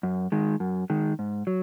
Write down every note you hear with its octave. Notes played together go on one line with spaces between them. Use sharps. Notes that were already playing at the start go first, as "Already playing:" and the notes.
F#2
D#3 G#3
F#2
D#3 G#3
G#2
F#3